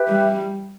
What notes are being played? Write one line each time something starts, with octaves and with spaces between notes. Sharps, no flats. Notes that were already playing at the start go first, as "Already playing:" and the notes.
Already playing: G4 B4 E5
G3